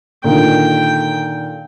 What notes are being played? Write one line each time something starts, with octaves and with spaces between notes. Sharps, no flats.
A#2 D3 D#3 G5